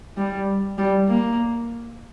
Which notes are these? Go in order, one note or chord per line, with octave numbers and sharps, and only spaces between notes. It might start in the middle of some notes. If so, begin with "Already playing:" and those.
G3
G3
A#3